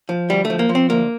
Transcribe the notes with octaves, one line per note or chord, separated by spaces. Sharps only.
F3
D2 G3
A3
F3
A#3
F3
C4
D2 A#3